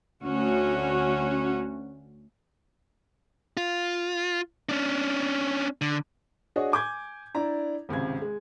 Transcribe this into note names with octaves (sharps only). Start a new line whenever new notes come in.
D2 C#4 F#4
F4
C#4 D4
D3
D4 F#4 G#4 C#5 D#5
G#5 D6 G6 G#6
D4 E4 D5 A#5
G#1 C#2 C3 G#6
G#3